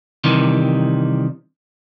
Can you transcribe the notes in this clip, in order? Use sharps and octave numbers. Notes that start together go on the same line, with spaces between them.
C3 D#3 E3 G3